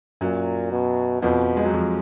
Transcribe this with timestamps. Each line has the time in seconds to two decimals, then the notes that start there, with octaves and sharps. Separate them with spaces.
0.21 F#2 A#2 F#3
0.72 B2
1.22 F2 B2 F3
1.57 G#3
1.65 F#3
1.73 F2 F3